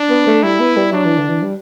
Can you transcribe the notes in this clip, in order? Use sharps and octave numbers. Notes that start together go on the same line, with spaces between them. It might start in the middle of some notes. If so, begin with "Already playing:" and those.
Already playing: D4
B3
A3
G3 E4
B3
G3
F#3 D4
E3
D3
E3
G3